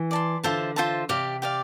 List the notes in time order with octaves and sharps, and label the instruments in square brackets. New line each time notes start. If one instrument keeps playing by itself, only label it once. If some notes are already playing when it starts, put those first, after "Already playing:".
Already playing: [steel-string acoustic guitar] E3
[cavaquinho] D5 A5 C6
[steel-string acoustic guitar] D3 [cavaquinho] F4 C5 E5 A5
[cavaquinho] F4 C5 E5 A5
[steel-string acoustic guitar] C3 [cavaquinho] G4 D5 F5
[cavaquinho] G4 D5 F5